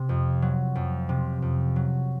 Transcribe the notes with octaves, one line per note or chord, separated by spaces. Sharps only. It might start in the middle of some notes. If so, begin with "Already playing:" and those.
Already playing: C3
F2
F#3
F2
C3
F2
F#3